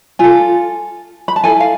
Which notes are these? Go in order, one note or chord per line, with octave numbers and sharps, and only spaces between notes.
F4 A4 G#5
B5
A5
E4 A4 G#5
F5